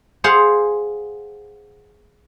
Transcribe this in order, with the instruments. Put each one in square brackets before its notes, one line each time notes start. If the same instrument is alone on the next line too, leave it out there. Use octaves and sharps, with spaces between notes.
[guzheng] G#4 C5 F5 F#5